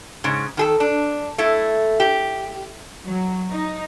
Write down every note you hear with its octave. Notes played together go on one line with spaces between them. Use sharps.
G#2 C#3
D#3 G#4 A4
D4
A3 E4
G4
F#3
D#4